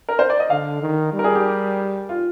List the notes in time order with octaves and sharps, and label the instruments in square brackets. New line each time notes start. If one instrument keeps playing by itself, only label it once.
[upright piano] A#4
C5
D5
D#5
[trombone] D3 [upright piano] F5
[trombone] D#3
G3
[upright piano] A#4
G#4
G4
F4